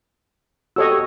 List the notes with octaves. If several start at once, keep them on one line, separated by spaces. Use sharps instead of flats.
F#4 G4 A4 C#5 D#5 E6